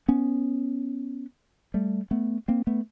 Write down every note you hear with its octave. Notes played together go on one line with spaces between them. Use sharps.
B3 C#4
G3 A3
A3 B3
A#3 C4
A3 B3